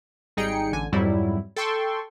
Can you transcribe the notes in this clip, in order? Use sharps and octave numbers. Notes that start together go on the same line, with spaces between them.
G#1 G3 D#4 G#4 G5 C#7
A1 D3 G#5
F2 G#2 F#3 G3 E4
A4 G5 C6 C#6